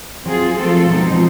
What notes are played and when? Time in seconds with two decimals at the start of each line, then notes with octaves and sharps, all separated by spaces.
0.25 F#3 C4 F4 G#4
0.57 F3 A3 C4 F4 A4
0.89 B2 F#3 G#3 C4 D#4
1.01 F#3
1.11 F3